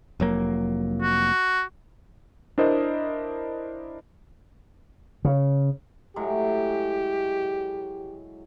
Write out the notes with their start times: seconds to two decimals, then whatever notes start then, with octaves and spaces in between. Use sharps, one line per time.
0.20 F1 F#3 A#3
1.02 F#4
2.58 D4 E4 A#4 C5 D#5
5.25 C#3
6.16 A2 F#3 G#3 G4